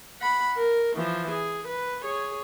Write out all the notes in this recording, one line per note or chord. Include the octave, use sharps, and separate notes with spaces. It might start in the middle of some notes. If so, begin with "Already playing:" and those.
F#5 B5
A#4
E3 F3
G#4
B4
G#4 C#5